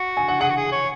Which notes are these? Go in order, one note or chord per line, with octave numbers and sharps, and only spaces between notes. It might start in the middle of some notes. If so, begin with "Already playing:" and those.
Already playing: F#4
G#5
F#5
G#4 F#5
F#4
G#4
C#5